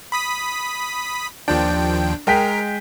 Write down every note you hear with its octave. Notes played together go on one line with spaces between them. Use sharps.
B5 D#6 B6
D#2 F3 D4 G5
G#3 A#4 G5 B6